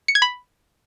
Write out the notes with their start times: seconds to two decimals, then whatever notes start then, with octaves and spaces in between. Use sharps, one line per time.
0.08 C#7
0.15 G#6
0.22 B5